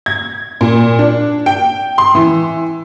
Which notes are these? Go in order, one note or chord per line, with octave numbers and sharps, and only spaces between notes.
G#6
A#2
D4
G5
C6
E3